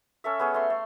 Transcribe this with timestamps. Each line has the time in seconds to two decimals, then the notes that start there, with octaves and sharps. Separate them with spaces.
0.24 C#4 A4 E5
0.39 B3 C#4 G#4 C#5
0.54 A3 C6
0.70 A3